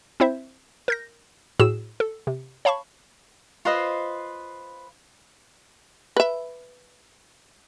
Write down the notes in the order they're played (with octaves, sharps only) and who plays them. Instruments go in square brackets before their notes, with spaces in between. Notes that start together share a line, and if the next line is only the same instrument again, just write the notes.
[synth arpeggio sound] C4 E4 C5 E5
A#4 G6 A#6
A2 F#4 G#4 E6 E7
A4
C3
C#5 F5 A5 B5 C#6
[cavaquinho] F4 B4 C5 D#5
[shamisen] B4 E5